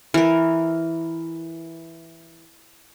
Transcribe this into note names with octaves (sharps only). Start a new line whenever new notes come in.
E3 A#4